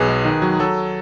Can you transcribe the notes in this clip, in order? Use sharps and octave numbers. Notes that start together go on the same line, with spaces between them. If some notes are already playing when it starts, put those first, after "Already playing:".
Already playing: B1 G#4 B4
G#3
D#3
F#3
F#3 A4